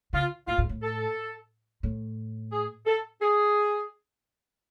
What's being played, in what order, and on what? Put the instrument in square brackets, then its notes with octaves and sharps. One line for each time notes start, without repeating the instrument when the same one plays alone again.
[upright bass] C#3 [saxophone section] F4
[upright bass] A2 [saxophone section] F4
[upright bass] G#2
A2
[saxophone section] A4
[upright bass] A2
[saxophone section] G#4
A4
G#4